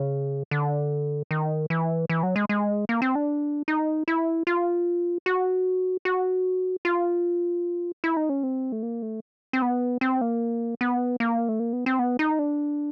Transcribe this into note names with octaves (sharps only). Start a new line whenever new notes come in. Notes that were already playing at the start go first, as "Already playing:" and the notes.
Already playing: C#3
D3
D#3
E3
E3
F#3
G#3
G#3
A#3
C4
D4
D#4
E4
F4
F#4
F#4
F4
E4
D#4
C#4
C4
A3
A#3
A3
C4
B3
C4
A#3
B3
A#3
A3
A#3
B3
C4
B3
D#4
D4